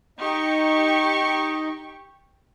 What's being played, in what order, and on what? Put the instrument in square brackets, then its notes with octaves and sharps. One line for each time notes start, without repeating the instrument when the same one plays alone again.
[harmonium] D#4 D#5 [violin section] G4 C#6